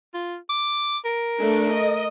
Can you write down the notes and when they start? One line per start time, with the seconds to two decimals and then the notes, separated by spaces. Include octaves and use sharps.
0.14 F4
0.49 D6
1.05 A#4
1.39 A3 D4
1.73 D#5